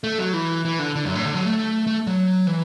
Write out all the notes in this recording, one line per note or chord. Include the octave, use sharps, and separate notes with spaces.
A3
F#3
E3
E3
D3
D3
F#2
A2
D3
F#3
A3
A3
F#3
E3